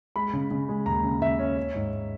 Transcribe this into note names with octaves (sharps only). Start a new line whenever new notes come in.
G#3 B5
C#3
C#3
G#3
D#2 A#5
C#3
C#3 E5
C#4
C#4
G#2